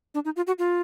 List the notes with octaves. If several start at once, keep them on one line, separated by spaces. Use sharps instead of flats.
D4
D#4
F4
F#4
F4